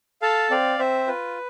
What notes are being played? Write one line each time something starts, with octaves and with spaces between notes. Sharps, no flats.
A4 F5 A5
C4 D5 F5
C4 C5 E5
F4 B4